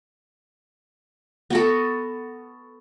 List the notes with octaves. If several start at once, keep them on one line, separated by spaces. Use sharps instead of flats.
B3 F#4 A4